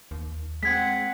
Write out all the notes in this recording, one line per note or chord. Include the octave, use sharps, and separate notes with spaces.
D#2
G#3 C4 F#5 G#6 B6